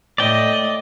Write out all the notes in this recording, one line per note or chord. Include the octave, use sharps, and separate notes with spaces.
A2 D5 D#5 G5